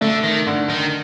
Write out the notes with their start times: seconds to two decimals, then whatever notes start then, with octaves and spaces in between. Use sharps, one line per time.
0.01 D3 A3
0.24 D#3
0.47 D3
0.70 D#3